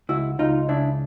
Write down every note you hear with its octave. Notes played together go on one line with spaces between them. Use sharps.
C#2 E4 F#4
C#2 D#4 F4
C#3 D4 E4